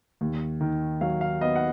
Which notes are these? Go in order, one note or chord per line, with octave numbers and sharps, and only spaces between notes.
D#2
D#3
F#3 F5
F5
B3 D#5
F#5